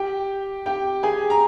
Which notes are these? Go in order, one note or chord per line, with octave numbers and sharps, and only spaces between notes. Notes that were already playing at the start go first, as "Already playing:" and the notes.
Already playing: G4 G5
G4 G5
G#4 G#5
A#5